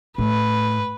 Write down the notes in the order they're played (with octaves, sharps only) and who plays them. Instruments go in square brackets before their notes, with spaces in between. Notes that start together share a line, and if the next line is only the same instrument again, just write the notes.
[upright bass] A2 [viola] B4